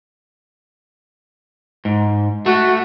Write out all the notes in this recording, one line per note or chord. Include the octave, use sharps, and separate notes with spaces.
G#2
A3 F#4